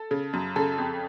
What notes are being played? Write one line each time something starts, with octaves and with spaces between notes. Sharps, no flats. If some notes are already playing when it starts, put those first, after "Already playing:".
Already playing: A4
C#3
F#2
C#3 A4
F2